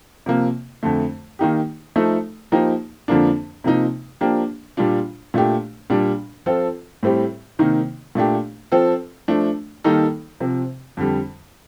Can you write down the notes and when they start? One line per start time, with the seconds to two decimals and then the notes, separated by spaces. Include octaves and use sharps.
0.26 C3 F3 A#3
0.83 F2 D3 A3
1.39 D#3 A#3 D#4 G4
1.96 F3 A3 D#4 A4
2.52 F3 A#3 D#4 G4
3.08 F2 D3 F3 A#3 D4
3.64 C3 F3 A#3 D#4
4.21 F3 A#3 D4 G4
4.77 A#2 G3 D4 F4
5.34 A#2 A3 D4 G4
5.90 A#2 G3 D4
6.46 F3 C4 F4 A4
7.03 A2 G3 C4 G4
7.59 C3 D#3 A#3 D#4
8.15 A#2 A3 D4 G4
8.72 F3 C4 F4 A4
9.28 F3 A3 D4
9.84 D#3 G3 A#3 D#4 A4
10.40 C3 F3 C4
10.97 F2 D3 G3